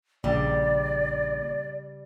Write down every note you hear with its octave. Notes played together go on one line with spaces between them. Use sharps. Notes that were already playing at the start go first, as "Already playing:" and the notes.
A#1 C#3 G3 D5